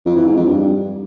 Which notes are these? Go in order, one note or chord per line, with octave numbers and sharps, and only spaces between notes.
F2
E3
G#2
F2
G2